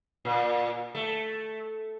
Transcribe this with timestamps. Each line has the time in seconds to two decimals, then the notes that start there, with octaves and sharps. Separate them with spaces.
0.25 A#2
0.95 A3